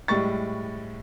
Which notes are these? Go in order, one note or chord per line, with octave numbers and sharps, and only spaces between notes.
A2 G3 G#3 C#6 A6